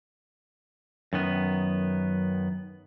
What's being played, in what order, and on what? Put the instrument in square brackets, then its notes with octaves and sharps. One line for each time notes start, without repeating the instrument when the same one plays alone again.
[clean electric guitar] F#2 D#3 B3